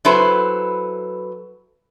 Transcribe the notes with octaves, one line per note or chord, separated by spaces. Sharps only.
F#3 E4 A4 B4 C5